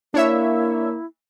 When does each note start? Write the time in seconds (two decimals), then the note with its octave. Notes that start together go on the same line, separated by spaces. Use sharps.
0.14 A#3 D4 E4 C#5 E5